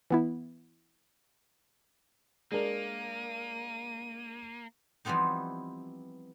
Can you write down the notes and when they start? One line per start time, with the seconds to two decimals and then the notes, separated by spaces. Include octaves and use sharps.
0.10 E3 B3 E4
2.52 G#3 A#3 D4 A#4 D#7
5.05 E3 F3 G3 B3 C4 D#4